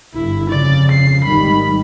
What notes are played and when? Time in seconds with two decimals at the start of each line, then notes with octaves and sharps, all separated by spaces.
0.14 G1 E4
0.50 F2 C#3 D5
0.91 C7
1.24 G#1 D#3 G3 B5